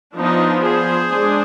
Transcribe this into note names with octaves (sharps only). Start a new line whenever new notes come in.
F3 B3 D4 D#4
G#4 C5
G#3 D4